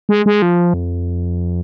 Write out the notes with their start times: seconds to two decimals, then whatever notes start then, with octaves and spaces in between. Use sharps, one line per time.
0.09 G#3
0.26 G#3
0.42 F3
0.74 F2